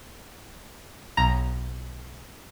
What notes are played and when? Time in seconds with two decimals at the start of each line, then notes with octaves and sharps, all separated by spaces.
1.17 B1 A#5